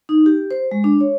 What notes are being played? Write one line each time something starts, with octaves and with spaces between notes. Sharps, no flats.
D#4
G4
C5
G#3
D4
C#5